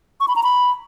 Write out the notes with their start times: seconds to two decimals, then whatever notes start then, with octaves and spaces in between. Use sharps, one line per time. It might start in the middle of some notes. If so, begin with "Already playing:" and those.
0.20 C#6
0.28 B5
0.36 A#5
0.43 B5